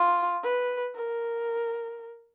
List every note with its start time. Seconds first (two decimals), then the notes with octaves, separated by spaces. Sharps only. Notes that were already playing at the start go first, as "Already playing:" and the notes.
Already playing: F4
0.43 B4
0.95 A#4